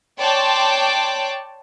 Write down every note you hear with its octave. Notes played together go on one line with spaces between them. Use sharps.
C#5 D5 G5 A5 C6 D6